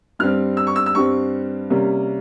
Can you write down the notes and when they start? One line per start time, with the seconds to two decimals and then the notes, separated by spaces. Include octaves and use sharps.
0.19 G2 G3 C4 F6
0.57 E6
0.67 C#6
0.76 E6
0.86 E6
0.95 G2 G3 C4 C#6
1.70 C3 G3 A#3 C#4